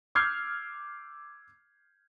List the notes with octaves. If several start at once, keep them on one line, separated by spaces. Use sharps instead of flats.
D6 E6 F6 G6 G#6 C7